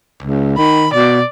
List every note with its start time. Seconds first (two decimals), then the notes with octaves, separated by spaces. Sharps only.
0.23 C#2
0.58 D#3 B5
0.93 B2 D5